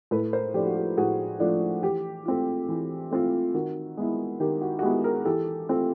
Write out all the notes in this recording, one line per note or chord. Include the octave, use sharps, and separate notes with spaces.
A2 A4 B4
A#4 C5
F3 A3 D4 F4 G4
F#4
G4
A2 F#4 G#4
F3 A3 D4 F4
E3 G4
A3 C4 F4
E3
A3 C4 F4
D#3 F#4
G#3 B3 E4
D#3 G4
F#4
F#4
G#3 B3 E4 G4
G#4 A#4
E3 G4 A4
A3 C4 F4